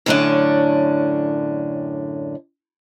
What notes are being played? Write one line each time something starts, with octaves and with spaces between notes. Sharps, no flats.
F#2 A2 D3 C#4 D4